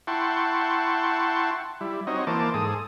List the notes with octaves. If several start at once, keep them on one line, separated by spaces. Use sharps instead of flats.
E4 F#5 G5 A5 C6 C#6
G3 E4
C4 D#4 F#4 C#5 D#5
E3 A#3 C5 A5 D6
G#2 G#4 A4 D#6